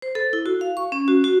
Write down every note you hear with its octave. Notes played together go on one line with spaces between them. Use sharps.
C5
A4
E4
F#4
F5
C#6
C#4
F#4
F#4